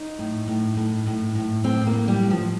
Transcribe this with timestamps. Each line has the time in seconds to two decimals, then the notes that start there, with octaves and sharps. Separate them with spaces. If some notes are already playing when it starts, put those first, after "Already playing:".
Already playing: D#4
0.19 A2
0.48 A2
0.77 A2
1.06 A2
1.35 A2
1.64 A2 C4
1.87 A#3
1.93 A2
2.08 G3
2.23 A2
2.30 F3